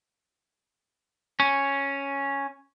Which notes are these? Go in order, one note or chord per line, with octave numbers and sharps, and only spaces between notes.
C#4